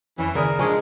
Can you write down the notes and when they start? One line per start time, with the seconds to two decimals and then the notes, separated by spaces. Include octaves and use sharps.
0.18 F2 E3 C#4
0.35 D#2 C#3 A#4 D5 E5 D#6
0.59 G#2 C3 F3 G#3 D4 G#5 C#6